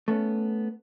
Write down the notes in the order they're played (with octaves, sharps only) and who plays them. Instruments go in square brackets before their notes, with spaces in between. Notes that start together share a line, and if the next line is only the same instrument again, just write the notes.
[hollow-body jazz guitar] A3 B3 C#4